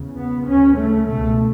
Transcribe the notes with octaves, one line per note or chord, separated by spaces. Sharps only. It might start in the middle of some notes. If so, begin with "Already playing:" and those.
Already playing: E2 C#3
B3
D2 C#3 C#4
A3
C#2 B2 A3